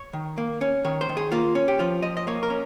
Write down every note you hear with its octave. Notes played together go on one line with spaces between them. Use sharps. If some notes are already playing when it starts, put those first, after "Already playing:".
Already playing: C#5
D#3
A#3
C#4
D#3 C#5
C5
D#3
G#4
A#3 F4
C#4
G4
F3 F4
F3 D#5
D#5
A#3 C#5
A#4
C#4